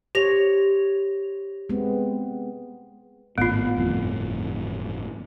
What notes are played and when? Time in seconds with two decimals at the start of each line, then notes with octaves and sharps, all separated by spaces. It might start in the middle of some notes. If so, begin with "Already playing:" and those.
0.15 G4 C5 C#5 A#6 F7
1.69 G#3 B3 C4
3.38 G#1 A2 B3 F4
3.76 G1 F2 A2